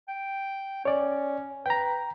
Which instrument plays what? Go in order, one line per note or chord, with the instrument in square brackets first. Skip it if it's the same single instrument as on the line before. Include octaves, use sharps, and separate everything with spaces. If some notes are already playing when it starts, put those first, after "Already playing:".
[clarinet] G5
[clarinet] C#4 [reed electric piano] C#5 D5
[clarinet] B4 [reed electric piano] G5 A#5